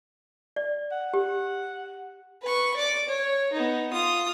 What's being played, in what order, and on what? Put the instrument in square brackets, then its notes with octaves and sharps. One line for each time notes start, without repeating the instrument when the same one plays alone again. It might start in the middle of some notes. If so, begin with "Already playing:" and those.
[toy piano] D5
[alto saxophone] F#5
[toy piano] G4
[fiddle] B4 C#6
D5 D6
C#5
B3 D#4
F4 D#6